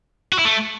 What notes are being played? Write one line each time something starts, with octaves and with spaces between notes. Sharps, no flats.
F#4
E4
A3